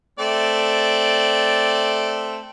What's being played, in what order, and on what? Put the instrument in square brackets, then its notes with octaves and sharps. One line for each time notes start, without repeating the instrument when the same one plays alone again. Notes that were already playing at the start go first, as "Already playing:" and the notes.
[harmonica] A3 C4 D5